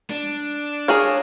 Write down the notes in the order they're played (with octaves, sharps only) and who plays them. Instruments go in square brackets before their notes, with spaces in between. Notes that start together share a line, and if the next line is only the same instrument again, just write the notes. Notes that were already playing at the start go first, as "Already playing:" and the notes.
[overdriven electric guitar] D4
[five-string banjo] G#4 A#4 C#5 [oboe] F5